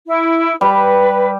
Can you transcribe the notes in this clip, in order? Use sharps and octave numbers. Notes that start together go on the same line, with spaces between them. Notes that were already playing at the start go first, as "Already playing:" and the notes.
E4
G3 B4